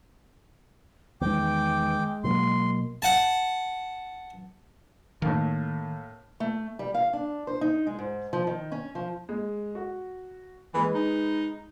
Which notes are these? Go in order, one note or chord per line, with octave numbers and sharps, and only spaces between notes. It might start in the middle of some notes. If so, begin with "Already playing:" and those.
E2 D#3 G#3 B3 G5 D6
B2 F#3 A#3 C6
F#5 A5
A2 D#3 A3 A#3
A3
G3
F5
D4
C5
D#4
G#3
G#2
F3
D#3
C#4
F3
G#3
F#4
E3 G#3 B4
D#4